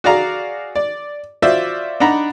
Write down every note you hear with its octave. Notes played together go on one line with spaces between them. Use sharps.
F#4 G#4 D5 F5 A#5
D5
F4 F#4 C5 D5 E5
D4 D#4 F#5 A#5 B5